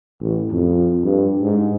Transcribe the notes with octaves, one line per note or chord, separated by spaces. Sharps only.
A1
F2
G2
G#2